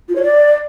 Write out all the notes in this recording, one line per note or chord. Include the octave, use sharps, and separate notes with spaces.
F4
C#5
D5